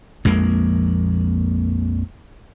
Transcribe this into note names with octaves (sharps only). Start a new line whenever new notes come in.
A#1 F2 G#3 A#3